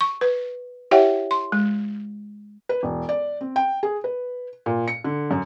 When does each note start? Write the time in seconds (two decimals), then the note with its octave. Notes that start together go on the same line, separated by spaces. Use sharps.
0.01 C#6
0.21 B4
0.91 E4 G4 C#5 E5 F#5 G5
1.31 C6
1.52 G#3
2.69 B4
2.83 E1
3.09 D5
3.41 C4
3.56 G5
3.83 G#4
4.04 B4
4.66 A#2
4.88 C#7
5.04 D3
5.31 F#2